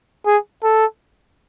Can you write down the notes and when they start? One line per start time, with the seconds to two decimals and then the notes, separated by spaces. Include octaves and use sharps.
0.26 G#4
0.63 A4